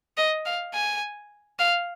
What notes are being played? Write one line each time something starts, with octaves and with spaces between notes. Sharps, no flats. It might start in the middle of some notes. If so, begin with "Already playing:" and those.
D#5
F5
G#5
F5